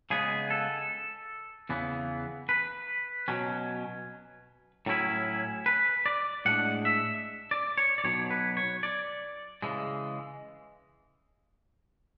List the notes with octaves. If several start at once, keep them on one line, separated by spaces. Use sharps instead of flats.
C#3 G#3 B3 G#4
A4
E2 C#3 E3 B3
B4
B2 F#3 C#4
A2 F#3 C#4 E4
B4
D5
A2 G#3 D4 F#5
E5
D5
C#5
D5
B1 B2 F#3 C#5
B4
C#5
D5
C#3 E3 G#3